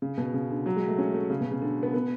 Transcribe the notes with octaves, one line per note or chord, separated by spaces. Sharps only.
C#3
B2
C#3
D3
F#3
G#3
A3
C#4
A3
C#3
B2
C#3
D3
B3
B3